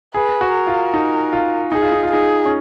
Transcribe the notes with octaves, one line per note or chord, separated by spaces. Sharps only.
G#4 B4
F#4
A#4
F4
D#4
F4
D#4 G#4
F4
D#4
F4
D#4 G#4
C#4